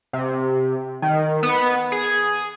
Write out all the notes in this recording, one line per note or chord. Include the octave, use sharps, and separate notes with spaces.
C3
D#3
B3
G#4